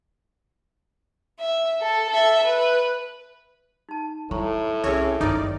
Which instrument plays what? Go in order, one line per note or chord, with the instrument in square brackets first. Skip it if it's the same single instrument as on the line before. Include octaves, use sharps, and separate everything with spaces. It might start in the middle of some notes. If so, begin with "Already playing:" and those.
[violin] E5
A4
A4 E5
B4
[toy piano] D#4 A5
[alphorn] A2 [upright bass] G3 [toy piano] C5 A#5 C#6
[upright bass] C2 [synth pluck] C#4 C#5 [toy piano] G#4 A#4 E5
[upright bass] G1 F#2 [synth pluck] D#3 D#4 D5 [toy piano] B4